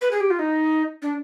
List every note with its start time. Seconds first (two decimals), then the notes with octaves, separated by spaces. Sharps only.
0.01 B4
0.11 G#4
0.20 G4
0.30 F4
0.39 D#4
1.02 D4